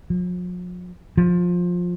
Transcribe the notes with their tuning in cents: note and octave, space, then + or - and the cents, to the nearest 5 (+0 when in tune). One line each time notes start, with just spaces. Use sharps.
F3 +45
F3 +15